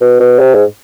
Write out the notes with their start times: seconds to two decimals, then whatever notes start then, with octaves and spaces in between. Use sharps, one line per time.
0.01 B2
0.20 B2
0.39 C3
0.55 G#2